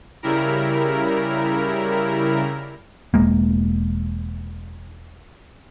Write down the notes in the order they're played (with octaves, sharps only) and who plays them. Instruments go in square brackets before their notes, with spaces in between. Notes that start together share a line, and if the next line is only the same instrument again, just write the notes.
[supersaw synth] C#3 G3 E4 A#4
[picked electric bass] E1 E2 G#3 A#3